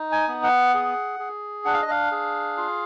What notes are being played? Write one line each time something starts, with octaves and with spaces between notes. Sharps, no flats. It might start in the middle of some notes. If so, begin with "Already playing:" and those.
Already playing: D#4
G#5
B3
F#5
G#4
G#4
D4 F#5
F5
D#5
F5
G#4
F4